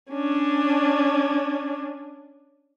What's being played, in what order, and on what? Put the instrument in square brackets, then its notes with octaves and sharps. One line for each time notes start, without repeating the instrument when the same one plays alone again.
[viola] C#4 D4